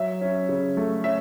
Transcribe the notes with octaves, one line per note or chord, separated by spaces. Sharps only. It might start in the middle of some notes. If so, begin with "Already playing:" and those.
Already playing: F#3 E5
C#4
C#3
A3
C#4 E5